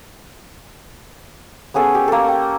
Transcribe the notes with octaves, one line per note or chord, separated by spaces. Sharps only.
B3 C#4 G#4 A4
G4
A#3 A4
G5